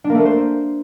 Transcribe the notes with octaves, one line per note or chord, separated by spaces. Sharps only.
D4
A#3
A3
A#3
C5